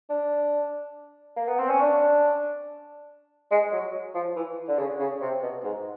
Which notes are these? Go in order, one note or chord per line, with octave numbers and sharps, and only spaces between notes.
D4
A#3
B3
C4
C#4
D4
G#3
F#3
F3
E3
D3
C#3
C#3
C3
B2
G#2